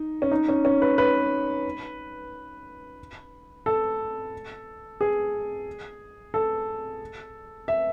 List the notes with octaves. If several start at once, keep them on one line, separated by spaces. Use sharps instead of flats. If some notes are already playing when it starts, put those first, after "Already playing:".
Already playing: D#4
C#4
D#4
C#4
C#4
B4
B4
A4
G#4
A4
E5